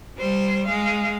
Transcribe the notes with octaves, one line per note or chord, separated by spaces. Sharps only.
G3 C5
G#3 F5